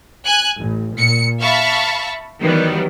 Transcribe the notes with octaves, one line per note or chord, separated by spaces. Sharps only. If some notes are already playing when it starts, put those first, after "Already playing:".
G#5 F#6
A1
A#2 C#7
E5 F5 A5 B5 C#6
D#3 E3 F#3 G3 B3